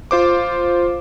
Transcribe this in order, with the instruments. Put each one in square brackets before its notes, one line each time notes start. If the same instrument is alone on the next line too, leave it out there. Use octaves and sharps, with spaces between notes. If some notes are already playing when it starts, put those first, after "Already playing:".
[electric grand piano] F4 C5 D6